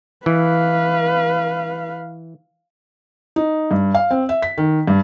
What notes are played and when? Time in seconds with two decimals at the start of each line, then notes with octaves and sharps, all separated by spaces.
0.26 E3 B4 F5
3.36 D#4
3.71 G2
3.94 F5
4.11 C4
4.29 E5
4.42 B6
4.58 D#3
4.88 G2